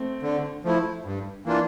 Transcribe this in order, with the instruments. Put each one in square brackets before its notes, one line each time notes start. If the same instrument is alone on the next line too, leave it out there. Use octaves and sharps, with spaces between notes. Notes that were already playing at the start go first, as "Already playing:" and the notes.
Already playing: [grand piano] A3 C4
[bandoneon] D3
F3 A3 E4
G2
E3 A#3 D4 F4